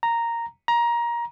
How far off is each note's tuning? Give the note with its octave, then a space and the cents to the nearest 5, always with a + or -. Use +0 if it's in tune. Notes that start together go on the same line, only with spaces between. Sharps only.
A#5 -5
A#5 +20